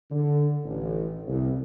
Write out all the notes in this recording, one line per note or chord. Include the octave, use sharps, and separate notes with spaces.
D3
A1
C2